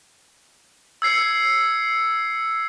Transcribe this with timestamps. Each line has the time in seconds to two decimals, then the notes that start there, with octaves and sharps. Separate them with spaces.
1.02 E6 G#6 C7 C#7